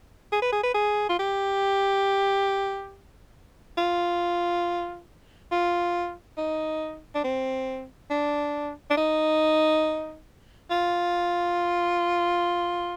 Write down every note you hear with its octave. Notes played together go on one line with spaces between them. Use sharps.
G#4
B4
G#4
B4
G#4
F4
G4
F4
F4
D#4
D4
C4
D4
D4
D#4
F4